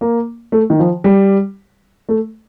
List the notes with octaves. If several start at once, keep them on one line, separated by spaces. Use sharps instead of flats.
A#3
A3
D#3
F3
G3
A3